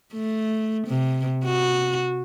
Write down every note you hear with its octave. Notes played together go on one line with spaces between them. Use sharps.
A3
C3
F#4